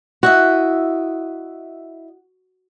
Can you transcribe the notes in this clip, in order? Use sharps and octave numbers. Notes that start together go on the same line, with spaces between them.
E4 F#4 D#5 E5